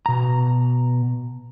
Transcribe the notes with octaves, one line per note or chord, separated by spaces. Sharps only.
B2 A#5